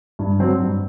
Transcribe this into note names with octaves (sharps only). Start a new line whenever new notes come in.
G2
F#3 C4
G2